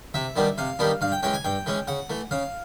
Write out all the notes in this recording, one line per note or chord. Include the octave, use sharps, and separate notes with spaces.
C3 E5
D#3 G3 B3 D4
C3 F5
D#3 G3 B3 D4
G2 F5
G5
E3 G#3 C#4 G5
G#5
G2 G5
E3 G#3 C#4
C#3 F#5
E3 A3
C#3 F5